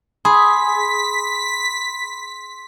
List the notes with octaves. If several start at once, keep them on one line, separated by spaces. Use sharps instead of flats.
G#4 B5 C6 B6